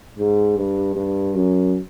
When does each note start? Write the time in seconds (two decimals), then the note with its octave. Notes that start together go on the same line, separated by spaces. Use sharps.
0.18 G#2
0.57 G2
0.96 G2
1.35 F#2